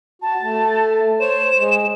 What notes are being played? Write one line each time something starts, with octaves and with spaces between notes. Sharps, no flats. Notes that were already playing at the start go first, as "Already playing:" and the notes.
F#4 A5
A3
C5 C#5 E7
G#3